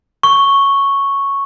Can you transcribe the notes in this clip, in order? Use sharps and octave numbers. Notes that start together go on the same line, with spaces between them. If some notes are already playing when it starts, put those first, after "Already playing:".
C#6